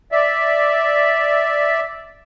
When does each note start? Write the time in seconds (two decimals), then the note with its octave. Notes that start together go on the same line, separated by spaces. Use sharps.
0.12 D5 E5